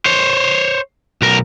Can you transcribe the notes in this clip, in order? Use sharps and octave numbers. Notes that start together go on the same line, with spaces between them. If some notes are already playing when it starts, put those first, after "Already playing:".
C5 C#5
B1 A#4